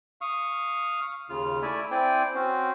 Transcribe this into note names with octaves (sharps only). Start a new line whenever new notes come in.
F5 C#6 D#6 F6
D#2 C#3 F4 F6
A3 E4 D5 E5 G#5
C4 E4 C5 D5 G5 G#5
C4 C#4 F#4 C5